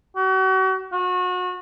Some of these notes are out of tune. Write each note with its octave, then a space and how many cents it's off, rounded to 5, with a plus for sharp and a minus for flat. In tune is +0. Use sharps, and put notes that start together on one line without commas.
F#4 +40
F#4 -30